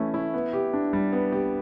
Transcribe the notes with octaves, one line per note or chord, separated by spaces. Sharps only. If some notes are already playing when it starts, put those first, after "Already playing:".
Already playing: E3 A3 C#4 E4
E4
B3
G4
D4
G3
B3
G4